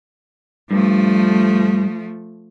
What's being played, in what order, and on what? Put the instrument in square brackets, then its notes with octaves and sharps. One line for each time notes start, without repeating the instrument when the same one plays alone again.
[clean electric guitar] G2 [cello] F3 A3